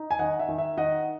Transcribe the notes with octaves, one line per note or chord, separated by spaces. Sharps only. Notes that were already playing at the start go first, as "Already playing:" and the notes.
Already playing: D#4
G#5
D#3 D#5 F#5
E5
D#3
E5
D#3 D#5 F#5